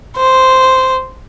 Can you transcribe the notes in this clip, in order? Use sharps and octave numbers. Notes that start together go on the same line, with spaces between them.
C5